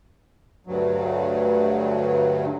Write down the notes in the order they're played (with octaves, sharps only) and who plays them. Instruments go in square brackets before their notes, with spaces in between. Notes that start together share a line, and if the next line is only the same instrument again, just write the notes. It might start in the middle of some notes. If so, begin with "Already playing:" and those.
[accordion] D2 G2 F#3